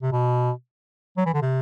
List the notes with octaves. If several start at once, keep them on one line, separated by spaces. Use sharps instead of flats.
C3
B2
F#3
E3
D3
C3